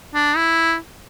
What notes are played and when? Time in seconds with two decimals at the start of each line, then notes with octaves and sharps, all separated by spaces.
0.14 D4
0.36 E4